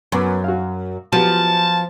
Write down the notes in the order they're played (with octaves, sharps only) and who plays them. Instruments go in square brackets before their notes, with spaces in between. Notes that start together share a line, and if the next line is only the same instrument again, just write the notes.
[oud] F#2 [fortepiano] B3 D6
[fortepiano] F#4 F5
[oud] F3 [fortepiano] F#3 B3 G4 [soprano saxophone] A5